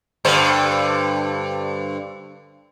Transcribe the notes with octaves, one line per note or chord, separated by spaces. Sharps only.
G2 D3 C5